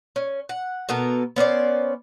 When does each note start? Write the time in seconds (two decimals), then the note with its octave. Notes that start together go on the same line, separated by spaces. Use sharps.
0.16 C#4
0.49 F#5
0.89 B2 B3 A4 A#4
1.36 B3 C#4 C5 D5